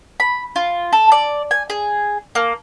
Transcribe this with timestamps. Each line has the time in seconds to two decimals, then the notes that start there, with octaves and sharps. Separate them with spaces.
0.20 B5
0.56 F4
0.93 A4
1.12 D5
1.51 G#5
1.70 G#4
2.35 A#3